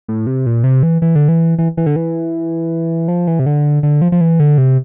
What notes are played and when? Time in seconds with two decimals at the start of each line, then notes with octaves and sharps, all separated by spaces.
0.08 A2
0.27 C3
0.46 A#2
0.64 C3
0.83 E3
1.02 E3
1.15 D3
1.29 E3
1.58 E3
1.77 E3
1.86 D3
1.96 E3
3.08 F3
3.27 E3
3.39 C3
3.46 D3
3.83 D3
4.02 F3
4.12 F3
4.21 E3
4.40 D3
4.58 C3